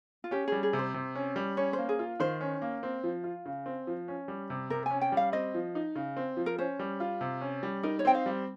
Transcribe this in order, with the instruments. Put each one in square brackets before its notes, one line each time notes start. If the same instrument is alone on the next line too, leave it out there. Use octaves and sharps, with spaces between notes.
[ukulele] F4
[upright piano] C#4 [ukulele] G4
[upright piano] G3 [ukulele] G#4
[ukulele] G#4
[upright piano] C3
[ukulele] C5
[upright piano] C3
C#4
G3
[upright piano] C#4 [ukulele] C#5
[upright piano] A#3 [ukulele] C5
[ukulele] G#4
[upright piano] F4
[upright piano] D#3 [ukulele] C5
[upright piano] C#4
A#3
C4
F3
F4
C#3
C4
F3
C#4
G3
C3
[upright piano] C3 [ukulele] A#4
[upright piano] C#4 [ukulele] G#5
[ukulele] G5
[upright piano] G3
[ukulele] F5
[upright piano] C4 [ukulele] D#5
[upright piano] F3
D#4
C#3
C4
F3
[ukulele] A#4
[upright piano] C#4 [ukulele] C5
[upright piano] G3
F4
C3
C#4
G3
[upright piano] D#4 [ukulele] A#4
[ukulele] C#5
[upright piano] C4 [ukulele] G5
[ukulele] F5
[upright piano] G3